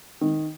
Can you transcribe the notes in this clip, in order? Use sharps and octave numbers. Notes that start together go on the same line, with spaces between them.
D#3